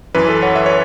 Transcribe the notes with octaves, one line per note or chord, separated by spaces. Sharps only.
F#2 E3 B4
A4
C#5 F#5
E5
C#5